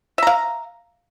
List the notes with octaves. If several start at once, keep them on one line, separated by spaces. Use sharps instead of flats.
E5 F5 A#5